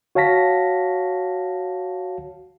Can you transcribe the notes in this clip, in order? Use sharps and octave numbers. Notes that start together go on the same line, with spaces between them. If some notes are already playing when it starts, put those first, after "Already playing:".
F#4 C#5 F5 A5 A#6 B6